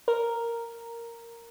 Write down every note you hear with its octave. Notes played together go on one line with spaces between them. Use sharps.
A#4